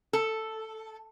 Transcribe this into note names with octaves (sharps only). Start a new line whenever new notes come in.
A4